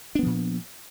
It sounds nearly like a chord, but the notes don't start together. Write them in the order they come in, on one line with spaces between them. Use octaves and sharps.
D4 B3 F3 A#2